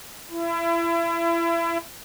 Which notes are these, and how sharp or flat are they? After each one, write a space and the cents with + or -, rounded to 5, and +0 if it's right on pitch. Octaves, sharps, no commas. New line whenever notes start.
E4 +30